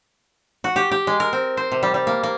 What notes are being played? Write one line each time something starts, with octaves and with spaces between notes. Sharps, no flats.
F#4
G4
G4
G#3
A#4
C4
C5
C3
G3
G3
A#3
A#3